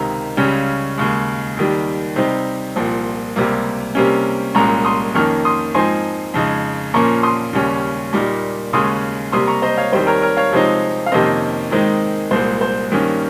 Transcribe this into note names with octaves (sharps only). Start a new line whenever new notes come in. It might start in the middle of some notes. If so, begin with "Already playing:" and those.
Already playing: C#2 C3 D#3 A#5
C#2 C#3 G3 C#4
D#2 C#3 G#3
D#2 D#3 G3
C3 G3 C4 D#4
C2 A#2 F3 C4
C#2 C3 G3 A#3
C3 G3 A#3 C#4
C2 A#2 G#3 C#4 A#5 C#6
C6 D#6
F2 D#3 A#3 C#4 C#6 F6
C6 D#6
G#2 F3 C4 D#4 G#5 C6
F2 C#3 G#3 D#4
A#2 F3 A#3 C#4 A#5 C#6
C6 D#6
D#2 C#3 G3 C#4
A#2 G3 A#3 D#4
D#2 C#3 G#3 C#4 C6 D#6
C3 G3 A#3 C6 D#6
A#5 C#6
C5 D#5
C#5 F5
D#2 D#3 G3 C4 C5
A#4 C#5
A#4 C#5
C#5 F5
C3 F3 G#3 C4 D#4
F5
F2 C3 D#3 A#3 C#4 C5 D#5
G#2 D#3 G#3 C4 D#4
C2 A#2 G#3 C5
C5
G2 D#3 A#3 C#4